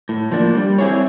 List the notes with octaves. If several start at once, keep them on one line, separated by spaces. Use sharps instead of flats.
A2
F3 A#3 D4
G3
C4 E4 G#4 C#5